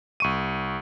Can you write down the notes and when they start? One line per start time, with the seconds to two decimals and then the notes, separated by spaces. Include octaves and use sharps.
0.20 C2 C#6 D#7